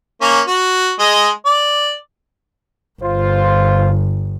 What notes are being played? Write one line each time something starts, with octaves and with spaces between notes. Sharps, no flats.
A#3 C#4
F#4
G#3 D#5
D5
G1 F4 C5